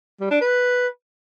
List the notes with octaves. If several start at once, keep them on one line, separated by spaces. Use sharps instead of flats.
G3
D4
B4